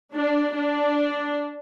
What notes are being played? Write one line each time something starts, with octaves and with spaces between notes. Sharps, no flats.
D4
D4